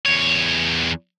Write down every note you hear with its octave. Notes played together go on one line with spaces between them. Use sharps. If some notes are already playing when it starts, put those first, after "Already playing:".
E2 C#5